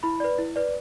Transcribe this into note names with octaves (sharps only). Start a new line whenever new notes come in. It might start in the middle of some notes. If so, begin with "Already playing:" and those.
E4 B5
B4 D5
E4
B4 D5